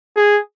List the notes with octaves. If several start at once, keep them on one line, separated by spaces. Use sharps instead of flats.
G#4